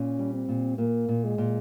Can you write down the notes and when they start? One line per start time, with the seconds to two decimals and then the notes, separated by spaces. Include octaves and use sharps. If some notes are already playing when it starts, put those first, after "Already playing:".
Already playing: A#2 C#4
0.19 G3
0.34 C4
0.49 A#2
0.78 A#2 A#3
1.08 A#2
1.24 G#3
1.38 A#2